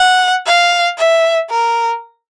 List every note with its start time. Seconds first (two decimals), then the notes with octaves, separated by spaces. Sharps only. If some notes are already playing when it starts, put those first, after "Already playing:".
Already playing: F#5
0.46 F5
0.98 E5
1.50 A#4